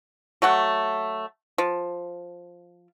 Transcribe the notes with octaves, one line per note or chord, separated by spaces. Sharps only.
F#3 A3 F#5
F3